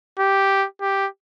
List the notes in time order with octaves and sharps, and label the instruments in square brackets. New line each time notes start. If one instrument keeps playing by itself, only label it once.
[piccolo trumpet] G4
G4